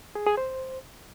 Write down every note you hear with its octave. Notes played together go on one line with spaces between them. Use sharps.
G#4
G#4
C5